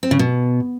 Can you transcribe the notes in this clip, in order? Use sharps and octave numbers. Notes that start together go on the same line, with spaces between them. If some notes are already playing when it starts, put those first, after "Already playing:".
C4
C#3
B2